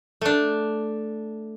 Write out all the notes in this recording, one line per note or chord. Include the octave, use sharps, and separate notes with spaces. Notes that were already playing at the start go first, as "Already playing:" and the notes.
A3 D4